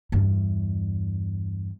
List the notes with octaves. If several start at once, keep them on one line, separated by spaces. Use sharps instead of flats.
E2 G2